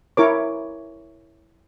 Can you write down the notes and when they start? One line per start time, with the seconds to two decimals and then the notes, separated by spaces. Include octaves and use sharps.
0.17 E4 A#4 C#5 D6